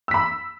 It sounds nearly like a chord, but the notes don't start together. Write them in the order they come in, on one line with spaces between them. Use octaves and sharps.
E6 B6 B5